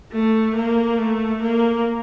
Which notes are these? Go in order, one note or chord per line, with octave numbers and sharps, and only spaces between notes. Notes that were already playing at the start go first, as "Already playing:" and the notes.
A3
A#3
A3
A#3